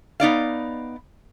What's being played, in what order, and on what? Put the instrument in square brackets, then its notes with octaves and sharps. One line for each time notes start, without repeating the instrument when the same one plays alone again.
[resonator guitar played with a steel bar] B3 D#4 D5 F5